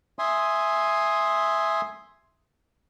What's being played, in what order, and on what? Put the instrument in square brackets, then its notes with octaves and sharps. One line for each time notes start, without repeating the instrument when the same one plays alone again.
[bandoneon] E5 G#5 C6 D#6